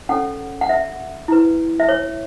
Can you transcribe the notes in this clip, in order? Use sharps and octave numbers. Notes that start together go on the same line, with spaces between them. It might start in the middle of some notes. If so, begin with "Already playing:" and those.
C#4 A4 C#5 F#5
F#5
E5
E4 B4
E5
C#5